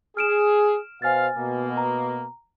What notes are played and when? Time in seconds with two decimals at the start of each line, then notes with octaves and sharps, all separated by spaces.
0.17 G#4 F6 D7 E7
1.02 B2 C5 F5 G#5 F6 A6
1.36 B2 A#3
1.77 A#5